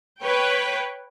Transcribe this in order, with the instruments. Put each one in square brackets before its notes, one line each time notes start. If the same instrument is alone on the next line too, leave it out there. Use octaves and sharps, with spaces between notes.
[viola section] B4 C#5 G5